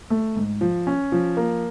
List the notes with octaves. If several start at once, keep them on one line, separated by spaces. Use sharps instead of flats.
A3
G#2
F3
C#4
F3
A#3